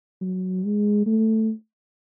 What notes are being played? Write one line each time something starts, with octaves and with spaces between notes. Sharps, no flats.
F#3
G#3
A3